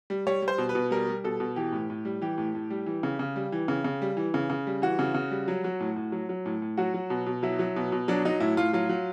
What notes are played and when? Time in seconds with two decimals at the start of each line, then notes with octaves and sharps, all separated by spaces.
0.10 G3
0.27 G3 C#5
0.42 G3
0.48 C5
0.58 B2
0.69 B4
0.75 B2
0.91 G3 A#4
1.08 G3
1.24 B2 A4
1.40 B2
1.56 E3 G4
1.72 A2
1.90 A2
2.05 G3
2.21 E3 G4
2.38 A2
2.55 A2
2.70 G3
2.86 E3
3.03 C#3
3.19 C#3
3.36 G3
3.52 E3
3.68 C#3
3.84 C#3
4.02 G3
4.17 E3
4.34 C#3
4.50 C#3
4.67 G3
4.82 E3 F#4
4.99 C#3
5.15 C#3
5.31 G3
5.48 F#3
5.64 F#3
5.80 A2
5.96 A2
6.12 F#3
6.29 F#3
6.46 A2
6.62 A2
6.77 F#3 F#4
6.94 F#3
7.10 B2
7.26 B2
7.43 F#3 E4
7.59 F#3
7.76 B2
7.92 B2
8.08 F#3 D4
8.25 F#3 D#4
8.40 A2 E4
8.57 A2 F4
8.73 F#3 F4
8.89 F#3